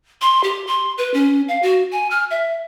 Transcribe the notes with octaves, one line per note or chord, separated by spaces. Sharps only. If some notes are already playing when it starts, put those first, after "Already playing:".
C6
G4
C6
B4
C#4
F5
F#4
G#5
F6
E5